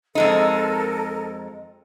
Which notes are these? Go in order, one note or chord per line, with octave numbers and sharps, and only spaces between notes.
F2 G#3 D#4 A4 A#4